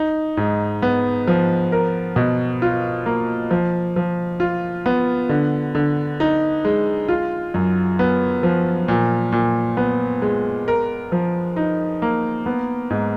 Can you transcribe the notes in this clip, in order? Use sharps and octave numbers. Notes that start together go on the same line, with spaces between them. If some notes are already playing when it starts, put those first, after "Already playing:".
Already playing: D#4
G#2
B3
F3
A#4
B2
F4
A#3
F3
F3
F4
B3
D3
D3
D#4
G#3
F4
F#2
B3
F3
A#2
A#2
B3
G#3
A#4
F3
D#4
A#3
B3
G#2